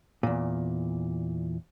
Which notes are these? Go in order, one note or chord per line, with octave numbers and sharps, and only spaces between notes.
E2 A#2